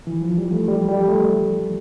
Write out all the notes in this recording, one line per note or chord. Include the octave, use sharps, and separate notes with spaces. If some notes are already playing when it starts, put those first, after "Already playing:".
E3
F3
G3
A3
G3
G3
A3